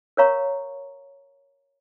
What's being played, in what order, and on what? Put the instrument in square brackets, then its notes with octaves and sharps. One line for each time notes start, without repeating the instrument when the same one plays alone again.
[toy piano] A#4 C#5 F5 A#5 C#6